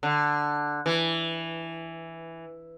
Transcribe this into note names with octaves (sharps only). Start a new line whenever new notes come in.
D3
E3